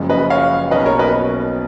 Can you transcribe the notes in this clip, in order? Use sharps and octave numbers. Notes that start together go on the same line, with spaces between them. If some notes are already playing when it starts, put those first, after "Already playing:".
Already playing: F#1 F#2 F3 G#3
B4 D#5
C#5 F5
B1 B2 A#3 C#4 B4 D#5
A#4 C#5
B4 D#5